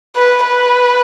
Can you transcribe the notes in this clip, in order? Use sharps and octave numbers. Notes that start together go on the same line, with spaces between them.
B4
B4